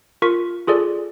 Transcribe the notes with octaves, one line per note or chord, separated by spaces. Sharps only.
F4 A#4 C#6 B6
F4 G#4 A4 D5